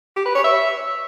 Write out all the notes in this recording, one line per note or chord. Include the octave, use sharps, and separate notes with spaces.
G4
B4
C#5
E5